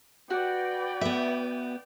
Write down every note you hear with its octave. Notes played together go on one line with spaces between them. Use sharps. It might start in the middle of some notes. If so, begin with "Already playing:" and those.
F#4 B4 D5 G5
B3 E5